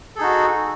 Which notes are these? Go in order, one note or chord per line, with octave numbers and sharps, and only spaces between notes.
D#4 F#4 G#4 A4